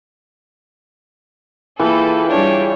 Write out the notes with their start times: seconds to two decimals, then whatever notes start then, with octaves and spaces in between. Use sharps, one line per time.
1.80 E3 A#3 F4 G#4 A4 B4 G5
2.30 G3 D4 C#5